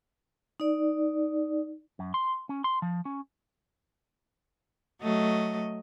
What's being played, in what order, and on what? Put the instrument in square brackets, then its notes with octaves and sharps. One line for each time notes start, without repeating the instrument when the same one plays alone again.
[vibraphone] D#4 D5
[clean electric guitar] F#2
C6
C#4
C6
F3
C#4
[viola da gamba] F#3 A3 D#5